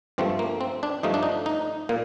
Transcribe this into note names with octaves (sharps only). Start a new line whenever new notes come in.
G2 F3 A3 C4
A#3
C4
D4
G2 F3 A3 D#4
D4
D#4
D#4
A#2 A#3